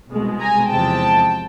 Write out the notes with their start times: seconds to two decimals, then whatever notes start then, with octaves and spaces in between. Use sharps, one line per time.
0.10 C2 B2 G#3
0.40 G#5 A#5
0.70 E2 C3 F3 G#3 G5 A5